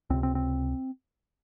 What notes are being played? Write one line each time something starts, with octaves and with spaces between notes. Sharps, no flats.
C#2 C3 C4
C4
C4